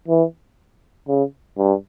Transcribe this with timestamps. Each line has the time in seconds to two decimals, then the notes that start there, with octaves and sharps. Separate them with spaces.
0.08 E3
1.08 C#3
1.58 G2